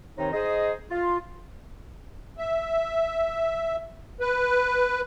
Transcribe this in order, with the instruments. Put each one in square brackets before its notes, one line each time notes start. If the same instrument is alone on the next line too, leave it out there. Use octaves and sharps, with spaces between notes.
[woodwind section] C3 D#3 C4 D#4 C#5
D#4 G#4 C5 D#5
F4
[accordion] E5
B4